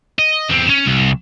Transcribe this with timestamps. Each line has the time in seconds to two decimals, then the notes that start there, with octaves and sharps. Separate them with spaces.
0.19 D#5
0.50 E2 C4
0.69 C#4
0.86 C2